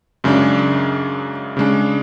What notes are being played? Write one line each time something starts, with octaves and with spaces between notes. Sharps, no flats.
F#2 C#3 G#3 D4
C#3 G#3 D4